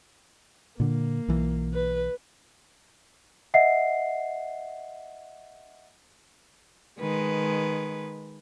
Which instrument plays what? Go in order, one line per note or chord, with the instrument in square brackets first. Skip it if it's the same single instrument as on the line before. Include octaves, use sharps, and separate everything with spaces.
[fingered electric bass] A#2 D3 [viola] A#3
[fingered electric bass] B1 E3
[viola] B4
[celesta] D#5 E5 F#5 C7
[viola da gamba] D#3 G#3 B4